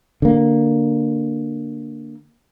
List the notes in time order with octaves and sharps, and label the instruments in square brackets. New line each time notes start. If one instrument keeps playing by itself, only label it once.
[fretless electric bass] D3 A#3